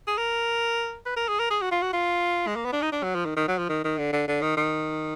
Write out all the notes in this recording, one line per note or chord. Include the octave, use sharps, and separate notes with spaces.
G#4
A#4
B4
A#4
G#4
A#4
G#4
F#4
F4
F#4
F4
G#3
A#3
B3
D4
D#4
D4
F#3
F3
D#3
D#3
F#3
F3
D#3
D#3
D3
D3
D3
D#3
D#3